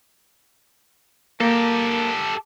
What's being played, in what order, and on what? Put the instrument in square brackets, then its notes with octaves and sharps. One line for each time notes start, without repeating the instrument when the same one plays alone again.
[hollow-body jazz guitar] A#3 [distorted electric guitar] G4 A4